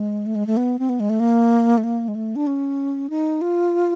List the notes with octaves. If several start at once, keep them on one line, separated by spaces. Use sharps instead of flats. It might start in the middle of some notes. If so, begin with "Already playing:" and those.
Already playing: G#3
A3
G#3
A3
B3
C4
B3
G#3
A3
A#3
A3
A#3
G#3
A3
D4
C#4
D#4
F4